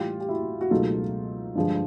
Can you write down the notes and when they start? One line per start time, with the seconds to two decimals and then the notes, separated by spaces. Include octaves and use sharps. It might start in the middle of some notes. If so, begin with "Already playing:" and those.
Already playing: A2 E3 G3 F4 G4
0.20 G4
0.29 E4 F#4
0.61 F#4
0.71 C#2 B2 F#3 A3 D#4 F4
1.55 G2 D3 F3 G#3